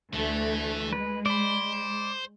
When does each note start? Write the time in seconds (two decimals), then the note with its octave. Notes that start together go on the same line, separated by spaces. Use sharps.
0.14 D2 E3 A3
0.93 G#3 B4
1.26 C5 D5 B5